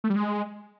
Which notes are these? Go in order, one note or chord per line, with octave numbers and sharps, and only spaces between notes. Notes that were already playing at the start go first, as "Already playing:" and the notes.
A3
G3
G#3